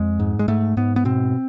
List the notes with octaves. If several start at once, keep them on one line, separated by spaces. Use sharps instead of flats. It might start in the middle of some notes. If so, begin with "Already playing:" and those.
Already playing: F2 G#3
G#2
G#3
G#2 A3
G#2 B3
B3
B2 C4